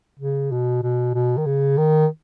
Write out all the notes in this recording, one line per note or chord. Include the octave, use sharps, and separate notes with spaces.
C#3
B2
B2
B2
D#3
C#3
D#3